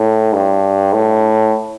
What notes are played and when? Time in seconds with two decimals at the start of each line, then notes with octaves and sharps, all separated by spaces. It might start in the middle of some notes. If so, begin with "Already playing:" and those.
Already playing: A2
0.33 G2
0.93 A2